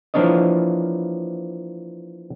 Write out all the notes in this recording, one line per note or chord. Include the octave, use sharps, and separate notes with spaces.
E3 F3 A#3 D4 C#5 D#5